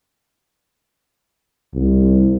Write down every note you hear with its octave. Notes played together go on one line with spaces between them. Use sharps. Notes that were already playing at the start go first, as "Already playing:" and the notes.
C2